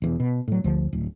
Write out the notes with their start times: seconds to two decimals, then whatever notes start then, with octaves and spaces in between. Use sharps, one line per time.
0.02 E1 E2
0.20 B2
0.48 A2 F#3
0.64 D2 D3 F3
0.93 D1